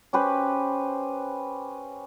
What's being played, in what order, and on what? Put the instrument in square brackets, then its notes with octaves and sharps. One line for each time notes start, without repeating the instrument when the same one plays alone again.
[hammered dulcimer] C#4 G4 B4 C5